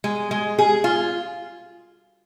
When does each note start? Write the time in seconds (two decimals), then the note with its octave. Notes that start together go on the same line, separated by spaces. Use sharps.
0.04 G#3
0.31 G#3
0.59 G#4
0.84 F4